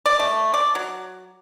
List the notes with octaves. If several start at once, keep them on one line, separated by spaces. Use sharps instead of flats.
D5
A3
D5
F#3